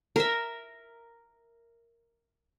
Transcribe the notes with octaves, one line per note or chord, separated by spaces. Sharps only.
A#4 E5